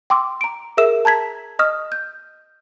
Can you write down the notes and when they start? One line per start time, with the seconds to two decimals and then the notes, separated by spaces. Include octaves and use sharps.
0.10 G5 C6 D6 E6
0.41 A#5 D7
0.77 G#4 A#4 E5 E6 E7
1.05 A5 A#5 G#6 B6
1.59 D#5 C#6 D#6 F6
1.92 G6